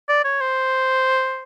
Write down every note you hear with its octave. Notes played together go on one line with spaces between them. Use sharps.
D5
C#5
C5